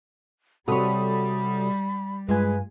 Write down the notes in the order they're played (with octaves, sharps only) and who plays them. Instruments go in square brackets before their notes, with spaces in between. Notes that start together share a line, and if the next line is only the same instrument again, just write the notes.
[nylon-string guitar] C3 C#5 [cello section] G3 [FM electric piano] F#4 A4 D#6 [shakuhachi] B5
[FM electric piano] G2 F4 G#5 [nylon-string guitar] G#3 [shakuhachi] B4